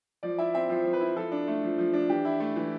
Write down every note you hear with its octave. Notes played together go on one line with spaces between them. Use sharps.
F3 D5
E4 E5
C4 E5
F3 C5
F3
B4
E4
F3 A4
D4
A3
F3
F3
D4
E3 G4
E4
A3
E3